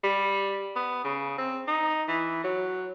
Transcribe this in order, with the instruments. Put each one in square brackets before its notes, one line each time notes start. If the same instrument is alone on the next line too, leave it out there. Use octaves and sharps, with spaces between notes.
[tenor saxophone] G3
B3
C#3
C4
D#4
E3
F#3